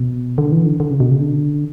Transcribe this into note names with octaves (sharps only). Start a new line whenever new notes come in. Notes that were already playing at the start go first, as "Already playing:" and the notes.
Already playing: B2
D3
E3
D3
D3
C#3
B2
C#3
D3